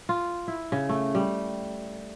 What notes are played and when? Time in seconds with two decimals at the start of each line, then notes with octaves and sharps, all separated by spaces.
0.09 F4
0.48 E4
0.72 C#3
0.89 A3
1.15 G3